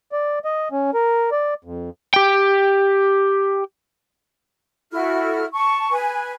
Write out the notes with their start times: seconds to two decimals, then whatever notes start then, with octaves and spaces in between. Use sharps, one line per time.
0.12 D5
0.45 D#5
0.72 C#4
0.94 A#4
1.32 D5
1.65 F2
2.14 G4 G5
4.92 E4 F#4 A4 F6
5.53 A5 C#6
5.91 B4 G#5